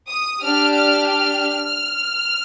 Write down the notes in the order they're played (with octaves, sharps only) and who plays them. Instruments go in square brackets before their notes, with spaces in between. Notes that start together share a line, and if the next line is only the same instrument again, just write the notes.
[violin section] D#6
D4 G4 F6
F6
F6